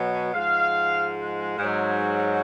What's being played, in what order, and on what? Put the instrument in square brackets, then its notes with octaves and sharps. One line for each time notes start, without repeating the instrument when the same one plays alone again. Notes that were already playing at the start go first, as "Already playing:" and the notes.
Already playing: [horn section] B2 F#3
G#2 F3 G#3 F5
G#2 F#3